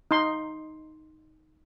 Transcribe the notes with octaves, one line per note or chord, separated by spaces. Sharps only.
D#4 C6